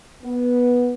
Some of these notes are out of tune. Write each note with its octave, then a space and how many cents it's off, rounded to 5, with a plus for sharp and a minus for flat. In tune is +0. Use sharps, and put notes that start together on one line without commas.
B3 -10